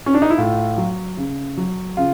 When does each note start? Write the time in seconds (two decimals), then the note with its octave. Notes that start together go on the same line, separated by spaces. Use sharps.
0.06 C#4
0.14 D4
0.22 D#4
0.30 E4
0.38 A2 F4
0.78 F#3
1.17 C#3
1.57 F#3
1.97 C#3 F4